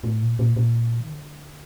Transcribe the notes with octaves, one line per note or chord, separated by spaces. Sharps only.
A2
A#2
A#2
A#2
D#3
D3